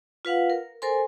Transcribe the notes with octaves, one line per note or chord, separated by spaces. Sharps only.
F4 B4 F5 F#5
A#4
A4 A#4 C5 G#5 C6